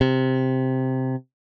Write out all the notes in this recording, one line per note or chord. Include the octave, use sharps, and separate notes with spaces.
C3